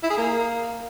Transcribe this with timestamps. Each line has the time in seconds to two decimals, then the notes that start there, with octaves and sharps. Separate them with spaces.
0.03 E4
0.10 G#4
0.17 A#3